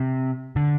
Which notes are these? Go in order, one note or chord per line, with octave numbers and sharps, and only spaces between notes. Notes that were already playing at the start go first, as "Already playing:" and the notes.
Already playing: C3
D3